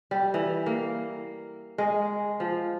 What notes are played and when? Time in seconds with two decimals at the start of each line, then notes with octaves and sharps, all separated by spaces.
0.11 G3
0.34 E3
0.66 A#3
1.78 G#3
2.40 F3